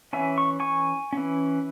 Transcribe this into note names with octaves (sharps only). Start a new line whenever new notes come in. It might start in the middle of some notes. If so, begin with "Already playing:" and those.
E3 C#4 E5 G#5
C#6
G#5 C#6
E3 C#4